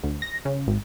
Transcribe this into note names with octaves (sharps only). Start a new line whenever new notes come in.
D2
A#6
C#3
G#1